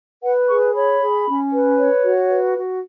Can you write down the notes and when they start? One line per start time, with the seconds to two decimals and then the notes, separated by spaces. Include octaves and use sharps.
0.23 B4 F#5
0.48 G#4 C#6
0.75 C#5 B5
1.01 G#4
1.27 C#4
1.52 B4
1.78 C#5
2.04 F#4
2.30 B4
2.56 F#4